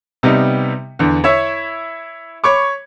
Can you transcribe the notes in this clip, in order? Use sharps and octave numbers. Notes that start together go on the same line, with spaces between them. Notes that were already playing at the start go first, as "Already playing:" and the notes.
C3 G3 B3 D#4
E2 D3
E4 C#5 E5
C#5 B5 C#6 D6